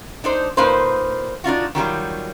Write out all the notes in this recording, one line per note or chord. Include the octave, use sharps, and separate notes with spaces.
D4 D#4 C5
A#2 A#3 D#4 B4 C5
D4 D#4 F4 F#4
D#3 F#3 G3 F4